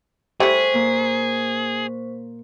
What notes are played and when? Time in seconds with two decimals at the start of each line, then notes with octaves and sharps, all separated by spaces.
0.40 G3 A3 E4 G#4 C5 C#6 B6
0.74 A#2 A#3